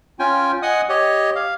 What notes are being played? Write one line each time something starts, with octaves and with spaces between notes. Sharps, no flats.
C#4 F4 G5 G#5
D#5 F#5 G#5 D#6
G4 C#5 D#5
F5